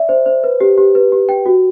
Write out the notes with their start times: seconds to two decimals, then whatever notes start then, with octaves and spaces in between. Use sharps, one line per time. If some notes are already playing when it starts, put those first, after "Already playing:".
Already playing: D5 E5
0.09 C5
0.26 C5
0.44 B4
0.60 G4
0.78 G4
0.95 B4
1.12 G4
1.29 G5
1.46 F#4